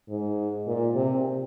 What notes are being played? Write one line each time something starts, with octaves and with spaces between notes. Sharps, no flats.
G#2
A#2
C3